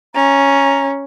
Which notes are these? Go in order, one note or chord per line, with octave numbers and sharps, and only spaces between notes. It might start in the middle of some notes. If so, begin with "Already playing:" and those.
C#4 A#5